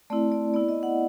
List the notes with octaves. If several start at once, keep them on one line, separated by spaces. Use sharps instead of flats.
A3 C4 E4 D5
D5
B3 E4 D5
D#5
F#5